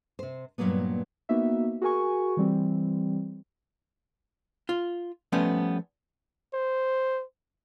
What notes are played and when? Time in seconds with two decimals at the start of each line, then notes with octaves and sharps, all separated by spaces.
0.19 C3 C5
0.58 G2 A#2 D#3 F#3 A#3 B3
1.29 A#3 B3 D#4 F#4 E5
1.82 F#4 G#4 A#4 G#5 C#6
2.37 E3 G3 C4
4.69 F4
5.32 F3 G3 A3 B3 C#4
6.53 C5